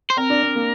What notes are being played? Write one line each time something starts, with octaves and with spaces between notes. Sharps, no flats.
C5
C4 A#4
D4
D4
A#3